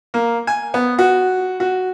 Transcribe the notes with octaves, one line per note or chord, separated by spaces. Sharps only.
A#3
G#5
B3
F#4
F#4